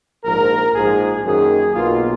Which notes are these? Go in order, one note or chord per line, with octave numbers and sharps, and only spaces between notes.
A#1 G#2 F3 A#4
A#1 G#2 F3 G#4
F#2 D#3 A#3 G#4
B1 B2 A#3 F4